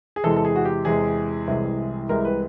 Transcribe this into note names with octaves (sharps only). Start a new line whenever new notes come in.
G#4
E2 C3 E3 G#3 A4
A4
G#4
F#4
G4
E2 C3 E3 G#3 G#4
C2 C3 E3 G#3
C2 C3 E3 G#3 A#4
B4